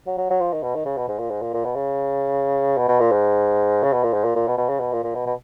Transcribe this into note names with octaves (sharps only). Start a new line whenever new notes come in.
F#3
F#3
F#3
F3
D#3
B2
D#3
C#3
B2
G#2
A#2
G#2
A#2
A#2
B2
C#3
B2
B2
A#2
G#2
C#3
B2
A#2
G#2
A#2
A#2
B2
B2
C#3
B2
A#2
A#2
B2
B2